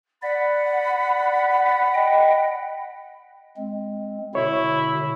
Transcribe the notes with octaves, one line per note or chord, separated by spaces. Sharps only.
D5 F#5 B5
D#5 G5
G#3 C4
B2 D3 E4 C#5